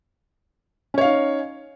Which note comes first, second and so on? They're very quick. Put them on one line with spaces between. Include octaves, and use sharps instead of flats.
C#4 C#5 F5 D#4